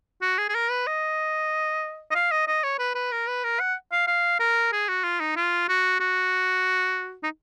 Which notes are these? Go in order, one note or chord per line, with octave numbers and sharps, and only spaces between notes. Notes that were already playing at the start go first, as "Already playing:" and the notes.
F#4
G#4
G#4
A#4
B4
D#5
D#5
F5
D#5
D#5
C#5
B4
B4
A#4
B4
A#4
F#5
F5
F5
A#4
G#4
F#4
F4
D#4
F4
F#4
F#4
D#4